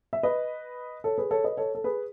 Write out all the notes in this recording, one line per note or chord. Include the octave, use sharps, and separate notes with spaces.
E5
B4 D#5
A4 C#5
G#4 B4
A4 C#5
B4 D#5
A4 C#5
A4
G#4 B4